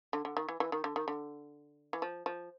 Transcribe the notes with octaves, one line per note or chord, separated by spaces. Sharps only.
D3
D3
D#3
E3
E3
D#3
D3
D#3
D3
E3
F3
F3